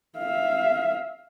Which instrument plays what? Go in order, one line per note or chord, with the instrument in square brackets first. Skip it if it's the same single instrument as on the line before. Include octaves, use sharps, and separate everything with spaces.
[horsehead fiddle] E5 F5